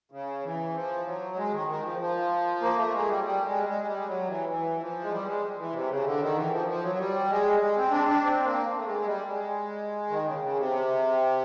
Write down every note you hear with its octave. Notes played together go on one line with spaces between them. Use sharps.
C#3
E3
F3
F#3
G#3
D#3
D#3
F3
F3
A#3
A3
G#3
G3
G3
G#3
G3
G#3
G3
F#3
E3
E3
F3
G#3
G3
G#3
E3
C3
C#3
D3
D#3
E3
F3
F3
F#3
G3
G#3
G#3
C4
D4
D4
C4
A#3
A3
G#3
G3
G#3
D#3
C#3
C#3
C3